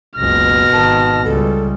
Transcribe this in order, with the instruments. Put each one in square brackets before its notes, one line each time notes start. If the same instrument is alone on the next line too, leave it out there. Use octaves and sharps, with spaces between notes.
[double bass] F#1 C#2 [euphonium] B2 [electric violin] F6 A#6
[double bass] G#1 D#3 [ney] A5
[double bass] C#2 G3 [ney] A4